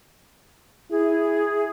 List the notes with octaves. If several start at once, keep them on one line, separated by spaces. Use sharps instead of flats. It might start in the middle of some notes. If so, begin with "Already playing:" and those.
E4 G#4